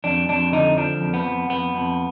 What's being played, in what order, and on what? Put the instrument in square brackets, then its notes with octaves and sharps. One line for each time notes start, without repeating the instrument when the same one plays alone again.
[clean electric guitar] F2 D4
F2 D4
D3 D#4
F3 D4
F2
B3
F2
F2 B3
F2